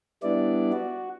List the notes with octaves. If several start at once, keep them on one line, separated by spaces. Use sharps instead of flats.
G3 B3 D4 E4 D5
F#4